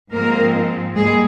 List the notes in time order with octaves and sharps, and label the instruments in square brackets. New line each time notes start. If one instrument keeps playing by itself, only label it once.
[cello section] G#2 F3 G#3 A#3 C4 A#4
G#2 G3 G#3 A#3 G#4